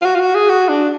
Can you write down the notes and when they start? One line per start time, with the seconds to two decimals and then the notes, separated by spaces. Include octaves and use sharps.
0.01 F4
0.05 F#4
0.15 F4
0.20 F#4
0.35 G#4
0.49 F#4
0.69 D4